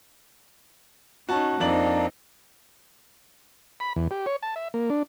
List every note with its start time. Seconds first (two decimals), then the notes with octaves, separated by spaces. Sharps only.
1.29 C#4 D#4 F#4 A5
1.60 F2 A#3 C4 D4 D#4 D5 F#7
3.80 B5
3.96 E2
4.11 G4
4.26 C#5
4.43 A5
4.56 E5
4.74 A#3
4.90 D4